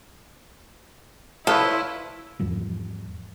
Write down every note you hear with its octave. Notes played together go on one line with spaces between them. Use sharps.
F3 E4 A4 B4 C#5
E2 G#2 F3 G3